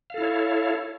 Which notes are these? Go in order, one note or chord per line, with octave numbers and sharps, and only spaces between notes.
E4 A4 C#5 F5